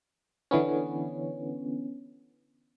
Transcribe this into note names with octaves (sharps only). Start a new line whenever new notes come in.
D3 E3 B3 C#4